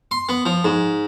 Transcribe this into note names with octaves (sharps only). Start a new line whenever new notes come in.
C6
B3
F3
G#2